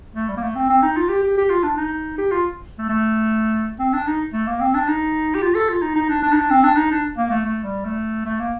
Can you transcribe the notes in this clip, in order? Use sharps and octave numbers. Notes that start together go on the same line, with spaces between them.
A3
G3
A#3
A3
C4
C4
D#4
F4
G4
G4
G4
F4
D4
D#4
G4
F4
A3
A3
C4
D4
D#4
A3
A#3
C4
D4
D#4
G4
F4
A4
F4
D#4
D#4
D4
D4
D#4
D4
C4
D4
D#4
D4
A#3
A3
A3
G3
A3
A3
A#3